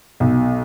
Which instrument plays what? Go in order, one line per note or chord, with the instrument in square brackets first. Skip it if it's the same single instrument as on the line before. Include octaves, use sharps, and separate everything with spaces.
[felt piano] B1